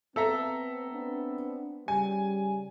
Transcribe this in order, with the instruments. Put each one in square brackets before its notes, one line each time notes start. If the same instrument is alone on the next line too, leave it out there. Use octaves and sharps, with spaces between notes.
[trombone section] B3 C4 [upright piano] A4 E5 A#5
[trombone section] B3 C4 D4
[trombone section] C#3 G3 [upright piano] G#5